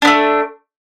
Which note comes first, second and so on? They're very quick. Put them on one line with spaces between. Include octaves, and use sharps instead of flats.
D4 B3 A3